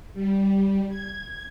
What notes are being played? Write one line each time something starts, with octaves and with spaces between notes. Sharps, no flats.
G3
G#6